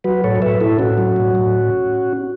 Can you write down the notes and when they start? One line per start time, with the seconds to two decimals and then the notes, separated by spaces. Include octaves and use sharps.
0.04 F#3 F#4 B4
0.24 A2 A4 C#5
0.42 A2 B4 E5
0.61 A2 E4 A4
0.79 A2 C#4 F#4
0.98 F#3
1.16 A2
1.35 A2